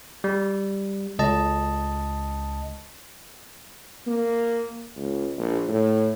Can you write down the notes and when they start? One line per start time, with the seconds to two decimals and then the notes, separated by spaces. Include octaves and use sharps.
0.24 G3
1.19 C#2 D#5 A5
4.07 A#3
4.96 C#2
5.38 A#1
5.68 A2